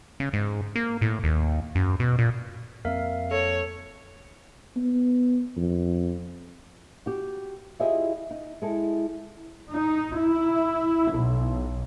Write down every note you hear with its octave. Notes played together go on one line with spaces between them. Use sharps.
C#3
G#2
A#3
A2
D#2
F#2
B2
A#2
F2 A#3 C4 A#4 E5 F5
A4 C#5
B3
F2
F#4 G4
E4 F4 G4 G#4 D#5 E5
D#4
G#3 E4 A4
D#4
E4
B1